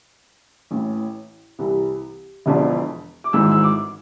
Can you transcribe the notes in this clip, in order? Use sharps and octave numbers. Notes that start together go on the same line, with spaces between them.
A1 A2 E3
C2 C3 E3
E1 E2 D3 F3
D6
G#1 G#2 E3 E6
E6
D6